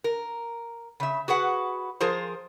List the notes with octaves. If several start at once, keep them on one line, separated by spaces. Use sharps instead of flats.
A#4
C#3 E5
F#4 G#4 B4 F#5
F3 F4 G#4 A#4 C5